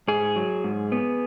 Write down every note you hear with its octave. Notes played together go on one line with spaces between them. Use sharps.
G#2 G#4
F#3
G#2
B3